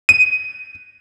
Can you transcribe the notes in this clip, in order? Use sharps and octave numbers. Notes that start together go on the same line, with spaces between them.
D#7